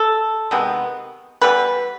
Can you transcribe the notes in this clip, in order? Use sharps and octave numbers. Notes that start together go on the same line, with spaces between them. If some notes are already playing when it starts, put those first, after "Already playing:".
Already playing: A4
C3 D#3 G#3 B3
E3 G3 B3 B4